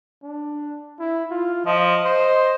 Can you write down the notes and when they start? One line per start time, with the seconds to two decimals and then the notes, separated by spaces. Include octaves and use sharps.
0.23 D4
1.00 E4
1.31 F4
1.66 F3 D#5
2.05 C5